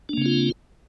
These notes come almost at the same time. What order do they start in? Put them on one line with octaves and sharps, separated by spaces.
D4 A#3 C#3 C4 F4